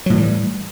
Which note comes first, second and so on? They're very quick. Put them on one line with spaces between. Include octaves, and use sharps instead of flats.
F#3 A2 E3 G3